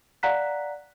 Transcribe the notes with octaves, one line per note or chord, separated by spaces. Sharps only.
D5 F5 F#5 A#5 F#6 B6